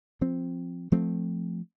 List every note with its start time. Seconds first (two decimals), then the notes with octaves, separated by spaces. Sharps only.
0.21 F3 C4
0.92 F3 A3 C4